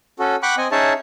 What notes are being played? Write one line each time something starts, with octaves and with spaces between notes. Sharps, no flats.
C#4 F#4 A4
F#5 G5 B5 C#6 D6 F#6
C4 D#5 G#5
C#4 D#4 G#4 C#5 E5 A5